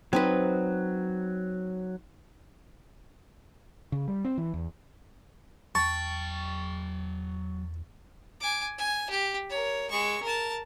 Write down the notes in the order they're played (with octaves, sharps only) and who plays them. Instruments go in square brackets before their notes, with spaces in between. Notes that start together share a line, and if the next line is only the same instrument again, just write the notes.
[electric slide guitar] F#3 [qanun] C4 D#4 B4
[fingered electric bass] C#3
G3
C4
E3
E2
[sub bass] E2 [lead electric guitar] F#3 G5 [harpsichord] A5 [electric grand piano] C#6
[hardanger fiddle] G#5 D6
G#5
G4
A#4 C#5
G#3 C#6
A#4 A5